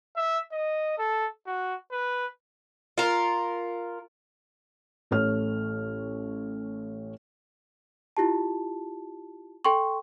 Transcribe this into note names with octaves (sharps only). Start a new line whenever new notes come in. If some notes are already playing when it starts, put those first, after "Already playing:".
E5
D#5
A4
F#4
B4
F4 A#4
A1 A3 C#5 F6
E4 F4 G4 A5
A4 G5 C6 C#6